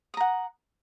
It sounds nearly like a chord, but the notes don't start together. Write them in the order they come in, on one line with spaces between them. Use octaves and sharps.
D#6 A#5 F#5